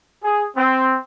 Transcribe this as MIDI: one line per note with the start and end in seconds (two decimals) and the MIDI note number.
0.23 0.43 68
0.56 0.95 60